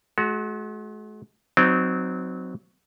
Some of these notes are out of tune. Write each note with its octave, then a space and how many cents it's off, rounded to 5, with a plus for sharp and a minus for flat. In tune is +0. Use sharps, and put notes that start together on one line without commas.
G#3 +45 F#4 +0
F#3 +0 C4 -25 D#4 -15